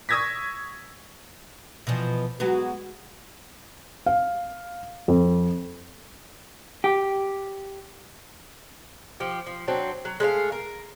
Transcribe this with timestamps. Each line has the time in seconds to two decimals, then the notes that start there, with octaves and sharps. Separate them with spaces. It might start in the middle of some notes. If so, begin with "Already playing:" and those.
0.09 C#6 D#6 E6 G#6 A#6 B6
1.87 B2 E3 F3
2.40 F#3 G#3 B3 F#4
4.06 F5
5.08 F2
6.84 G4
9.20 F3 G4
9.46 F3
9.68 F#3 C4 D4
10.05 F#3
10.20 G#3 A3 C#5 F5
10.52 A#4